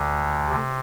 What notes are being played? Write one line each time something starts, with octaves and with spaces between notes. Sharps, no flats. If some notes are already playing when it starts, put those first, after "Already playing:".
Already playing: D2 D3
C3